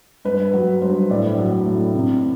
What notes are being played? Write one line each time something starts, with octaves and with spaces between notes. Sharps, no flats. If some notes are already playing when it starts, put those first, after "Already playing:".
G2 B4
F#3
G2 C5
A2 D5
F#3
A2
C3